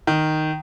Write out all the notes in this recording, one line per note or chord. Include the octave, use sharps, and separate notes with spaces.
D#3